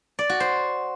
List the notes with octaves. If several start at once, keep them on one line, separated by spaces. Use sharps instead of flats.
D5
F#4
C5